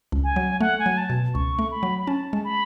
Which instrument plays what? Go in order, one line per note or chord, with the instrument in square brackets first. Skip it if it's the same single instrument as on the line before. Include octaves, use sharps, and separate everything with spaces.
[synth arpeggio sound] C#2
[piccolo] G#5
[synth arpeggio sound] F#3
[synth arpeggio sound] A3 [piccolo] F#5
[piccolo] G#5
[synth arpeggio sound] F#3
[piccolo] A5
[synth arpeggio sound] B2
[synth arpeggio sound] C#2 [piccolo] C#6
[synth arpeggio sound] A3
[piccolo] B5
[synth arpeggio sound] F#3
[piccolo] B5
[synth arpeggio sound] C#4 [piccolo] A5
[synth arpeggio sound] G#3
[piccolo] B5